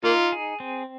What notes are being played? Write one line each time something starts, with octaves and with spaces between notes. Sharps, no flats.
A#3 D#4 F4
G#4
C4